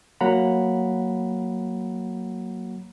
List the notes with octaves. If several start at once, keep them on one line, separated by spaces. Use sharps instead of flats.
F#3 A#3 F#5 A#5 B5